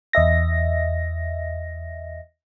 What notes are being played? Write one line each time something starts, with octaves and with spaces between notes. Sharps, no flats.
E2 D#5 E5 A#6